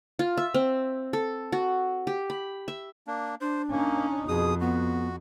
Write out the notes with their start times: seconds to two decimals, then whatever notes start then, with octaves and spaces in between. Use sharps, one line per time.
0.19 F4
0.37 E5
0.54 C4
1.13 A4
1.52 F#4
2.07 G4
2.30 B5
2.68 E5
3.07 A#3 D4
3.41 D4 C5
3.71 A#3 C#4 D#4
4.28 F2 B2 G#4 D#6
4.61 B3 F#4